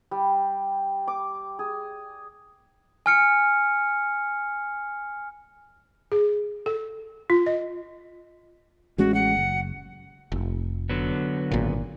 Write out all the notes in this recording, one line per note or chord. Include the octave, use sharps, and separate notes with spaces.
G3
D6
G#4
G#5 F6 C#7
G#4
A4
F4
D#5
A1 G#3 C#4 F#4
F#5
F#1
F1
D3 F#3 B3
G#1 A#2